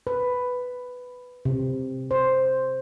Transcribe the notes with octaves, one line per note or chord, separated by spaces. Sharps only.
B4
C3
C5